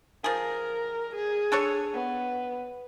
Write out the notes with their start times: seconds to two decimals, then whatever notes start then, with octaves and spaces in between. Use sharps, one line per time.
0.24 F3 G#4 A#4
1.15 G#4
1.52 D4 A4 C#5
1.94 B3